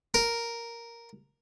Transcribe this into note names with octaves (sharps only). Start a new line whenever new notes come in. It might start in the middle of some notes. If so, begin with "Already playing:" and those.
A#4